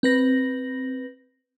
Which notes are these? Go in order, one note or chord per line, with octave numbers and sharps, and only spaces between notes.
C4 B4 A#6